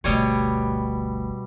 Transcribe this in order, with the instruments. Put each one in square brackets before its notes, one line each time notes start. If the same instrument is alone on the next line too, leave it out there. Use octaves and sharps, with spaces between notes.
[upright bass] G1 D2 [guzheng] B2 G3 C#5